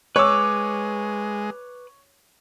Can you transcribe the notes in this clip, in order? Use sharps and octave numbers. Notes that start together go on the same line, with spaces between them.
G#3 B4 C#5 D6 E6